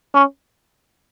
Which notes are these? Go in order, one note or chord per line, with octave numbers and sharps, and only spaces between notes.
C#4